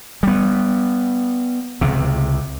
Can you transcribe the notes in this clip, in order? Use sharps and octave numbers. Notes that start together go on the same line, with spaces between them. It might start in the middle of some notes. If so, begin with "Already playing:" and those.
G3 B3
C#2 C3